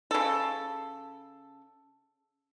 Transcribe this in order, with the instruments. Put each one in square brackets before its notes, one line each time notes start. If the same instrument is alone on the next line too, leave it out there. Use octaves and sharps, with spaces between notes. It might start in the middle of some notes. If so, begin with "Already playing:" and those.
[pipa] C#3 A4